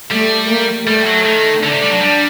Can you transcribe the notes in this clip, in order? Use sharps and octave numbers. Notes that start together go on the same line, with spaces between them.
G3 A3
A#3
G3 A3
F#3
D#3
D3 D4
C3
G3
F#3
G3